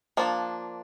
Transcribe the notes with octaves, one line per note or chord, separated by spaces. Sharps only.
F3 A#3 D4